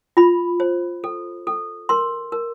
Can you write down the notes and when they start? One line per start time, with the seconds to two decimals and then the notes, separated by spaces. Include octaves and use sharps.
0.17 F4 B5
0.60 C5
1.04 A4
1.47 A4
1.89 A#4 C6
2.32 A#4